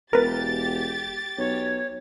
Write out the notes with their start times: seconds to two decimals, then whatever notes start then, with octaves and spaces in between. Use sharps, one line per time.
0.13 E1 G4 A#4 B4 A6
1.38 B1 C#5